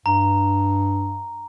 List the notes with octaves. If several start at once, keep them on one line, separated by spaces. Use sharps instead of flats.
G2 A#5